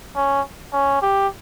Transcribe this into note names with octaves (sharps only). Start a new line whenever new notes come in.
C#4
C#4
G4